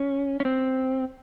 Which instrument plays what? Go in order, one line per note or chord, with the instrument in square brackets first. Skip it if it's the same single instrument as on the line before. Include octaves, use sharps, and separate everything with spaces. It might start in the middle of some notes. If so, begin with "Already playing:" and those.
Already playing: [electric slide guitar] C#4
C#4
C4